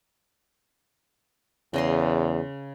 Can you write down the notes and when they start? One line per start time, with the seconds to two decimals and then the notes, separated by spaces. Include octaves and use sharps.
1.74 E2 C#3 D#5 C6